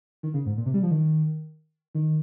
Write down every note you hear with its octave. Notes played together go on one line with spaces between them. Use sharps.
D#3
C#3
G#2
A#2
C3
G3
F3
D#3
D#3